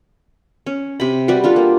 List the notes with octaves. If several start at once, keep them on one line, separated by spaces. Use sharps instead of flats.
C#4
C3 B5
G3 F#4 G4 B4
D4 F4 A4
A#3